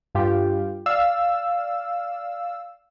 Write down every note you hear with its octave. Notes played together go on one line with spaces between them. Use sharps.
G2 F4 G4
D5 F5 E6